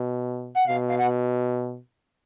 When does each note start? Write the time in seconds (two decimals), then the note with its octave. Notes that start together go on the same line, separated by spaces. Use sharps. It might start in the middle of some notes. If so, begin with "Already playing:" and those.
Already playing: B2
0.55 F#5
0.66 B2 F5
0.88 F5
0.98 F#5